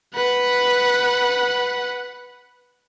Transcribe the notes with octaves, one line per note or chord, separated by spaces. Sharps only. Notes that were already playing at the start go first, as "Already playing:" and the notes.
B4 F#5